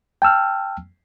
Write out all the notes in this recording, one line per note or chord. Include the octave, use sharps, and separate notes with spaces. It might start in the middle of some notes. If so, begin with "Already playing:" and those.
G5 A5 E6 F6